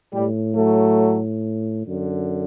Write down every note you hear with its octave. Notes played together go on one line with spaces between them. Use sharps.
A2 G3
F#3 A3
F#2 D3